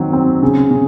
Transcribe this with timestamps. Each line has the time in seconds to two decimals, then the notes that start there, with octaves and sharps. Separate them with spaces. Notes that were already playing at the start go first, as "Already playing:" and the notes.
Already playing: D#3 F#3 C4
0.13 C4
0.43 C#3
0.71 C#3